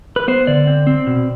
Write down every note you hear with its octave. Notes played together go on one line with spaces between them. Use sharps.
B4
B3 C5
D3 D5
C4
C4
B2